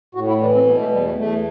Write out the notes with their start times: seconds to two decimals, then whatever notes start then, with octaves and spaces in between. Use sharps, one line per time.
0.15 A2 F#4
0.29 E4
0.41 E3 D4
0.54 C4
0.66 B2 B3
0.79 A3
0.92 E2 G3
1.05 A3
1.18 E2 A3